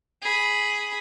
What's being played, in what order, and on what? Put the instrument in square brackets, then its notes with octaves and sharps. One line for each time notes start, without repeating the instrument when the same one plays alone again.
[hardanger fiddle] G#4 B5